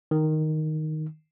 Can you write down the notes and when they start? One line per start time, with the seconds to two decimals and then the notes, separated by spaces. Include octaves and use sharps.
0.11 D#3